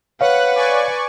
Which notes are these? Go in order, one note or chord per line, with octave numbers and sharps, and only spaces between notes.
B4 C#5 F5 F#5 F#6
D5 G#5 C#6